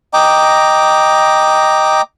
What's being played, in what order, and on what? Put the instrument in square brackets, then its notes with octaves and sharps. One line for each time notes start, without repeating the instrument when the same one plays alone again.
[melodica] D#5 G5 A#5 D6